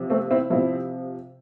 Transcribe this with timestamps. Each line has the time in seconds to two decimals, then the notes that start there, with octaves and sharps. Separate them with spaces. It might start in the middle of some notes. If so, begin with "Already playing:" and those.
Already playing: C3 F3
0.10 A3 C4
0.30 C4 E4
0.50 C3 F3 C4 E4